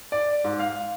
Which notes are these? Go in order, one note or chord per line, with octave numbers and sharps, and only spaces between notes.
D5
G#2
F5